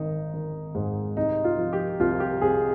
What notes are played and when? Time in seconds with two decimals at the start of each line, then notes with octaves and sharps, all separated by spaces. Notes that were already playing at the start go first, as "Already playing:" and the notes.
Already playing: G#1 D#3 D#4
0.34 D#3
0.75 G#2
1.17 C2 D#4
1.44 F4
1.58 F3
1.73 G4
2.00 C2 F4
2.20 G4
2.41 C2 G#4